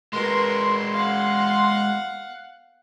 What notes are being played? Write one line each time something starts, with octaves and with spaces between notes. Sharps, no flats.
G#3 F#4 A#4 B4 C6
F5 F#5